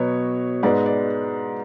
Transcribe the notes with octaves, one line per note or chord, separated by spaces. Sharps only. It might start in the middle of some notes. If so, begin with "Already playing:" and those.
Already playing: B2 F#3 B3 C#5
G#2 G#3 B3 D5
D5